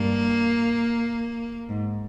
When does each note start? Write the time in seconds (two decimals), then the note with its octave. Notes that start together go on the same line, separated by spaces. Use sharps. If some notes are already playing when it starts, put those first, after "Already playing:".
Already playing: G2 A#3
1.69 G#2